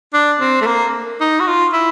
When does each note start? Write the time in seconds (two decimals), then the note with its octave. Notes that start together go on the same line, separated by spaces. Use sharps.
0.14 D4
0.40 C4
0.61 A3
0.67 A#3
1.21 D#4
1.40 F#4
1.47 F4
1.73 E4